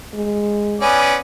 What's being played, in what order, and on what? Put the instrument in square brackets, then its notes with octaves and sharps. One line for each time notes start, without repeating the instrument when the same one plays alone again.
[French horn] G#3
[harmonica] B3 C#4 D5 [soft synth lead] G#5